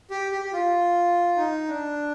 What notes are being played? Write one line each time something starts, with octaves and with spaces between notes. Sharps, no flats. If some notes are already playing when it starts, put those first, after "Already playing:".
G4
G4
G4
F4
D#4
D4